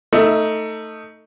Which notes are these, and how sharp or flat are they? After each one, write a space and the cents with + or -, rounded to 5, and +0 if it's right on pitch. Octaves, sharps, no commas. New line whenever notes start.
A3 +20 D#4 +10 E5 +0